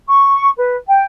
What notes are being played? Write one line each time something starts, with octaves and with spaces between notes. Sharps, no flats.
C#6
B4
G5